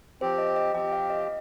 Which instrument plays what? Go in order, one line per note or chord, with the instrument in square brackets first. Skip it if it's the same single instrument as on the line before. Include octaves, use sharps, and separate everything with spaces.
[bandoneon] F3 C4 G4 [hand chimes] C5
[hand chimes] D#5
D#5
[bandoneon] F3 C4 G4 [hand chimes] G5
[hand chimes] F5
D#5